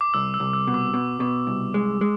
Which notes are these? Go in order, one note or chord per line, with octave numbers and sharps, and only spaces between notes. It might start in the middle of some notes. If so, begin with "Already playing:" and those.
D6
C2 E6
E6
C2
E6
B2
D6
B2
B2
C2
G#3
G#3